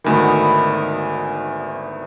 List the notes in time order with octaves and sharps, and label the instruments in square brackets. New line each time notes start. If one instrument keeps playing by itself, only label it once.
[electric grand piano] G#1 D2 D#3 [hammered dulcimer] E3 B3